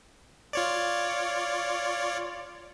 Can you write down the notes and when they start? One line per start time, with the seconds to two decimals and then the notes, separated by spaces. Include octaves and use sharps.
0.53 F4 C#5 D5